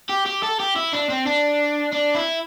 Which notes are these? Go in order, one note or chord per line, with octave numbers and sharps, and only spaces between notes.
G4
G4
A4
G4
E4
D4
C4
D4
D4
E4